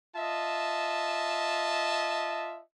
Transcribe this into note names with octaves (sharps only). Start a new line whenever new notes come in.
F4 D#5 E5 A5